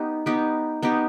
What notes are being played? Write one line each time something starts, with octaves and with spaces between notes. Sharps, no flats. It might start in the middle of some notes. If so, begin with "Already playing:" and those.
Already playing: B3 D#4 G4
B3 D#4 G4
B3 D#4 G4